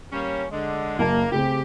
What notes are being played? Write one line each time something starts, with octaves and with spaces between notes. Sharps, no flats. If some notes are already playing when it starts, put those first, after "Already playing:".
G3 A#3 C#4
D3 G#3
F#1 F#2 A#3 A5
C#3 A3 C4 G4